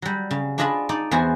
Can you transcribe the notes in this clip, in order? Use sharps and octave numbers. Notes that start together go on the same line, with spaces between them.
F#3 G3
C#3
D4 F4 G#4 D#5 A5 B5
D#4 D5
E2 E3 B3 F#4 G#4 C5